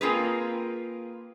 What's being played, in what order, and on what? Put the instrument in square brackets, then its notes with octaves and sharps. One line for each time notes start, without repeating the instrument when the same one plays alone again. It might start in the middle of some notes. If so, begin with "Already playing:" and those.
[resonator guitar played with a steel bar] A#3 C4 F4 G#4 A#4 B4